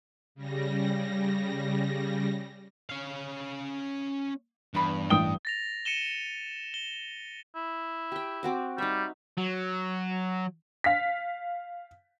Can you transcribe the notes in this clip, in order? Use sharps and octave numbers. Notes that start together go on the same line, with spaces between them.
C#3 G3 A#6
C#4 F5
E2 G2 B5
A1 G5 D#6 G7
A6 A#6 F7
C#7 D#7 E7 G7
G7
E4
G4 G5
C4 F#4 D6
G3 D#4 E5
F#3
F5 B6